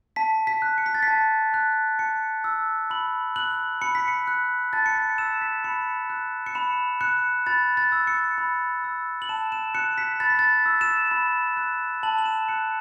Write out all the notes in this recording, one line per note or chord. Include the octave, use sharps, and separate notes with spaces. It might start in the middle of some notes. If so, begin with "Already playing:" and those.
A5 B6
B6
F#6
C#7
B6
A6
B6
A5
F#6
A5 C#7
E6
B5 F#7
F#6 F#7
B5 C#7
B6
C#7
F#6
A5 A6
C#7
B6
E6 E7
B6
B5 C#7
F#6
C#7
B5 E7
F#6 C#7
B5 A6
A6
E6
C#7
B5
E6
F#7
A5 E7
E7
F#6 C#7
B6
B5 A6
B6
A6
E6
E7
B5
F#6
A5 F#7
F#7
E7
F#6 C#7